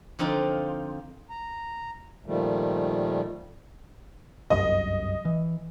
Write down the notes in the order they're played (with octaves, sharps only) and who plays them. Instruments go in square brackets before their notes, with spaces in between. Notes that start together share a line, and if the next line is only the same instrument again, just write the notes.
[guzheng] D3 F3 C4 D#4 F4
[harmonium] A#5
A#2 D#3 F3 G3 A3
[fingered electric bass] G1 C2 F#2 [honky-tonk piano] D#5
[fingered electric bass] E3